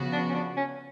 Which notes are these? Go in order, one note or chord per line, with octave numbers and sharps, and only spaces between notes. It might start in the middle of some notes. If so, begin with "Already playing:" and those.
Already playing: C#3 F3 B3 F#4
D4
C#4
D4
C#4